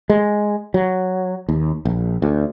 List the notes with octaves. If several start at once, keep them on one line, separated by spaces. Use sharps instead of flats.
G#3
F#3
D#2
A#1
D2